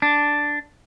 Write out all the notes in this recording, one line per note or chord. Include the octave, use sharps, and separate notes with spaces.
D4